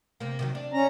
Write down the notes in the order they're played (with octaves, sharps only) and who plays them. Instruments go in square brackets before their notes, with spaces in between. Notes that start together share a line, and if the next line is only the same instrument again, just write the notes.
[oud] C3 A#3
C3 D#3 F#3
D4
[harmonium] C#4 A#5